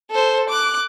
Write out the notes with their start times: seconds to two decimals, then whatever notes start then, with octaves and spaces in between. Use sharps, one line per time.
0.11 A4 C5
0.49 D6 F#6